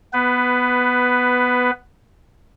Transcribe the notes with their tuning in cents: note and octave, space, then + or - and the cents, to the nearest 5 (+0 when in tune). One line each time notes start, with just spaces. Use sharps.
B3 +0 B4 +15